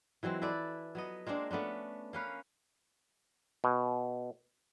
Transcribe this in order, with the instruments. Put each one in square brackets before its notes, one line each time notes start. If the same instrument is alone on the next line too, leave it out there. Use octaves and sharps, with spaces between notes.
[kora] E3 F#3 G#3 C4
E4 A4 B4 D5
F#3 B3 D#5
G#3 A#3 C4 D4
A3 B3 C#4 D4
A#3 C#4 B4 F5
[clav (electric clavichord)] B2